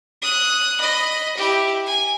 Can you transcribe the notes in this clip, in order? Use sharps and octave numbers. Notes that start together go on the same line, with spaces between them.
D#6 F#6
D#5 B5
E4 G4
G#5